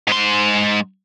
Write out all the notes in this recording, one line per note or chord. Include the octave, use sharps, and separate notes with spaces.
G#2 C6